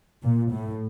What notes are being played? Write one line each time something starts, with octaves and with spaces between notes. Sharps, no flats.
A#2
A2